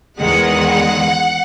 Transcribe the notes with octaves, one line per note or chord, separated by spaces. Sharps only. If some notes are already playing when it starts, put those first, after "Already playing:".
E2 D#3 G#3 F#5